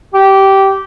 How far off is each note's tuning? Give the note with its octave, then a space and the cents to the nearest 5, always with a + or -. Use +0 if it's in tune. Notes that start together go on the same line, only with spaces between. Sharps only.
G4 -15